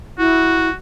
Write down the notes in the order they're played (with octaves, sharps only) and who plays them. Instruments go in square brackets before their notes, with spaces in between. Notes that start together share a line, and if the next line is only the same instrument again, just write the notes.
[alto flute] E4 [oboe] F#4